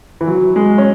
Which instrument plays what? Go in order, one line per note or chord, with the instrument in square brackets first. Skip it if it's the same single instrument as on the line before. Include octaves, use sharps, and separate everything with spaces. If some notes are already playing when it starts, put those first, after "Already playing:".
[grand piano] E3
F#3
G#3
C#4